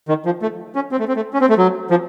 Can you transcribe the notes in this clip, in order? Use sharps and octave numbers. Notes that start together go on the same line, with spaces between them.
D#3
F3
A3
C#4
C4
A3
C4
A3
C#4
C4
A3
F#3
F3